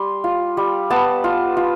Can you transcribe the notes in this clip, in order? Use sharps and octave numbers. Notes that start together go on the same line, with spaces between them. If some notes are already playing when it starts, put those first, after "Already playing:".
Already playing: G3 C6
F4
G3
B3 A5
F4
F4